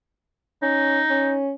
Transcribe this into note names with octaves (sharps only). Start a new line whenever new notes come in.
C#4 D#4
C#4